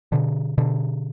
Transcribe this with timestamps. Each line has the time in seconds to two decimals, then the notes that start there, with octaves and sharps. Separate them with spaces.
0.12 B2 D3
0.58 B2 D3